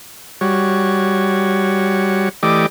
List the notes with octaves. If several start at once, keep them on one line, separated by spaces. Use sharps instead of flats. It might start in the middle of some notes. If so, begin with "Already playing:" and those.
G3 F#4 C#5
E3 A3 G4 D5 D#5 D6